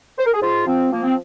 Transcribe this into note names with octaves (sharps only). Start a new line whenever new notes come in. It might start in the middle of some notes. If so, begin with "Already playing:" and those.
C5
A#4
G#4
G#2 F4
F3 C4
F3 A#3
C4